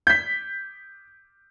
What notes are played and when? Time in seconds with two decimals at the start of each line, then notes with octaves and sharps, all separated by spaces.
0.07 G6 B6